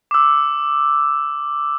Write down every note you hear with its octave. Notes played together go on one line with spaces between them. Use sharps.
D6 E6